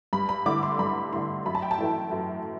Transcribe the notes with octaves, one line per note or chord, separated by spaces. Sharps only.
G2 B5
B5
D3 A3 E4 D6
C6
G2 B5
D3 A3 E4 C6
F#2 B5
A5
G5
A5
E3 A3 E4
F#2